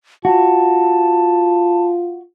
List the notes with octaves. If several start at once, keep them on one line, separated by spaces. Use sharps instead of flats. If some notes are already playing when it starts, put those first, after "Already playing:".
F4 F#4 A5